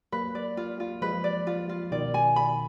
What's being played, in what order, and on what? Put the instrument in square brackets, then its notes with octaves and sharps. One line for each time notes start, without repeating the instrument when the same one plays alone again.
[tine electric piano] F#3 A#3 [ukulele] B4
[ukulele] D5
F4
F4
[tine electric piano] F3 G#3 [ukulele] B4
[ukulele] D5
F4
F4
[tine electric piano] B2 D#3 [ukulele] D5
[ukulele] G#5
B5